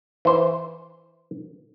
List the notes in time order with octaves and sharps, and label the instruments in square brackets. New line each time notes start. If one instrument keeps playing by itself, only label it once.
[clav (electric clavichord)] E3 C5